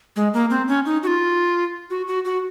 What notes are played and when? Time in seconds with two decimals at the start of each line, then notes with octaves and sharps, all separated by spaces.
0.16 G#3
0.33 A#3
0.50 C4
0.68 C#4
0.85 D#4
1.03 F#4
1.07 F4
1.90 F#4
2.07 F#4
2.25 F#4